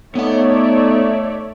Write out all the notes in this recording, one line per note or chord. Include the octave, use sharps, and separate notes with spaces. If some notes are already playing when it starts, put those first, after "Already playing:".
A3 B3 D#4 C#5 D5 E5 F#5